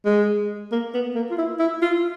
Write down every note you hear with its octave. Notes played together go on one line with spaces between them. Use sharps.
G#3
A#3
B3
A#3
F4
E4
E4
F4